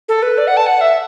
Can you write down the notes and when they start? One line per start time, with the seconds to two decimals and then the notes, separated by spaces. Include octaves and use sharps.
0.09 A4
0.23 B4
0.38 D5
0.47 F#5
0.57 A5
0.67 F#5
0.81 E5